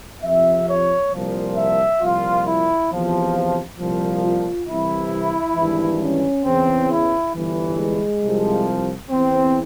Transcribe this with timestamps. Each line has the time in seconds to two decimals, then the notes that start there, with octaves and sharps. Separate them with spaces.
0.23 F2 C3 F3 E5
0.67 C#5
1.12 C2 A#2 F3
1.56 E5
2.00 C2 A#2 F3 F4
2.44 E4
2.89 E2 C3 F3
3.77 C2 A#2 F3
4.22 F4
4.67 C2 C3 E3 E4
5.55 G#1 G2 E3
6.00 C#4
6.44 E2 C#3 E3 C4
6.88 E4
7.33 G1 G2 E3
7.77 G#3
8.21 C2 C3 F3
9.10 E2 E3 C4